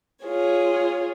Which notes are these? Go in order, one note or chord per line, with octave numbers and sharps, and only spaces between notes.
F4 G#4 C#5